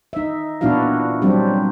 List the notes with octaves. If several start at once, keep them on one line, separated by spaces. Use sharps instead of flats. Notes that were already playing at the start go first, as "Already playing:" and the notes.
D#4 E5
A#2 B3 D4 E4 F#4 F5
F#3 G3 C4 D4 G4